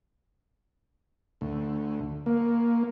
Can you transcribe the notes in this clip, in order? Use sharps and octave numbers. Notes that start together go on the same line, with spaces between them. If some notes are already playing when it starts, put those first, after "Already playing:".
D2
A#3